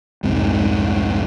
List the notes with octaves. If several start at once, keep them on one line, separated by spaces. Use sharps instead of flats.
F1 C2 G#2 C3